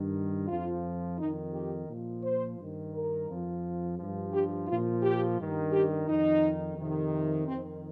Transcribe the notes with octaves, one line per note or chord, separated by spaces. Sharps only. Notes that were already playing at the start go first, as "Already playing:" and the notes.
Already playing: G2 D#3
F2 F3 F4
F2 D#3 D#4
G4
A#2 F3
C5
G2 D#3
A#4
F2 F3
G2 F3
G4
A#2 F3 F4
G4
G2 D#3
G4
F2 D#3 D#4
F2 C3 D#3
F2 D#3 C4